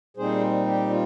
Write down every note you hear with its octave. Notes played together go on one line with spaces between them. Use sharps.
A#2 G3 C4 D#4 G#4 C5
G4
F4